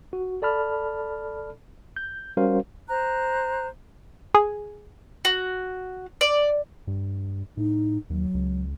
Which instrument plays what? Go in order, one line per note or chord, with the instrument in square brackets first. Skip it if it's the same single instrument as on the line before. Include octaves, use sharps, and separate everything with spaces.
[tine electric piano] F#4
A4 D5 A5 B5 F6
G6
G3 C#4 F#4 A#4 C5 F5
[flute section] C5 A#5 F#6
[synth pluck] G#4
[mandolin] F#4
D5
[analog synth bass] G2
[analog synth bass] A2 [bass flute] D#4
[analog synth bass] D#2 [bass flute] F#3
[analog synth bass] C#2